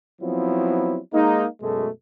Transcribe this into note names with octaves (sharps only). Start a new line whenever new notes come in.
F3 F#3 B3 C4 E4
G#3 A#3 D#4
F#2 B2 G#3 A3